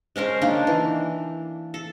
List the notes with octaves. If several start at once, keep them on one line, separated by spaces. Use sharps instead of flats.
G#3 C#4 A#4 C5
D#3 A#3 D4 D#4
E3
A4